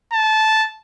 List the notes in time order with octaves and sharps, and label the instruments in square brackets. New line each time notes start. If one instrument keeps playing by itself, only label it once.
[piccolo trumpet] A5